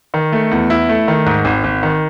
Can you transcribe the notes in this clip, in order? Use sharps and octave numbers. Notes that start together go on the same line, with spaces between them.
D#3
A3
E2
E4
A3
D#3
G#2
G#1
G#1
D#3